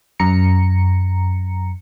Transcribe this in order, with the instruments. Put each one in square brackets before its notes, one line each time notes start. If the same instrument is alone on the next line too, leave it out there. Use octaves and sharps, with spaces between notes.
[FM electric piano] F#2 A#5 C#7